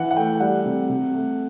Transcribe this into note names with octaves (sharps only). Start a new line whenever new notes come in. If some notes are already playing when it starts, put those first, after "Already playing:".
Already playing: E3 F#5
F#5
A3 G5
G3 F#5
C3
C3
A3